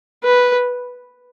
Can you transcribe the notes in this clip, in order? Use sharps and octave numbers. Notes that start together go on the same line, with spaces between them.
B4